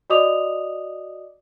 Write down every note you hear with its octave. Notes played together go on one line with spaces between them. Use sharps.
F#4 D5 D#5 D6 D#6 F7